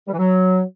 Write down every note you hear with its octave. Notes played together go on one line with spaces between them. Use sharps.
G3
E3
F#3